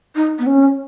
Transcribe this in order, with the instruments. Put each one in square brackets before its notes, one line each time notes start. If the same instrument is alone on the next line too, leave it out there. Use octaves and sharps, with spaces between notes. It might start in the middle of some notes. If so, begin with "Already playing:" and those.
[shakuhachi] D#4
B3
C#4